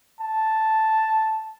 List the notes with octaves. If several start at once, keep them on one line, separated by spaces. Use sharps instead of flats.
A5